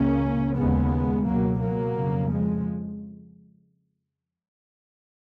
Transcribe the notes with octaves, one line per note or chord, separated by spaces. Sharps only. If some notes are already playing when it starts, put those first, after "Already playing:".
Already playing: C#2 C#3 A#3 C#4
D#2 C#3 G#3 B3
C#2 B2 F#3 A#3
F#3 A#3
F2 C#3
F3 G#3